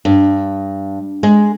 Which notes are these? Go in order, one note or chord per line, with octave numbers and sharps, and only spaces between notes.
G2
G#3